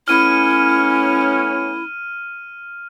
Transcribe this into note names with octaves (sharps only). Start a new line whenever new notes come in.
A3 B3 C#4 E4 F6 D#7